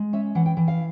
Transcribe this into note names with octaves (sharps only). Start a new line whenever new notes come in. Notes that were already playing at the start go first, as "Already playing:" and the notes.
Already playing: G#3
C#4 E5
E3 F#5
G5
E3
F5